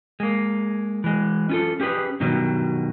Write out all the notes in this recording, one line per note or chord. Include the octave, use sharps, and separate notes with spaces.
G#3 A#3
E3 G#3
C#4 F4 A4
C#4 G4 G#4 B4
G2 B2 D#3 F#3 G3